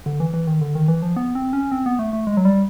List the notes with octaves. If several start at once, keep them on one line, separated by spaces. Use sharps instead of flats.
D3
E3
E3
D#3
D3
D#3
E3
F3
B3
C4
C#4
C4
B3
A3
A3
G#3
F#3
G3